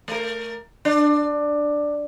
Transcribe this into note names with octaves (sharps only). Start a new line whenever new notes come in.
A3 A#4
D4